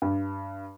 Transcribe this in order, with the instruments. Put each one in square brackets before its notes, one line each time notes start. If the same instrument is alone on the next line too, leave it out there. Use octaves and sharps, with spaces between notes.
[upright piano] G2